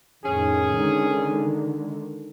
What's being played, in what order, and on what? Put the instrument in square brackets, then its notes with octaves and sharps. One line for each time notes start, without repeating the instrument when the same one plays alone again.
[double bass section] F2 A2 D#3 [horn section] C#4 G#4
[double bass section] D3 D#3 G#3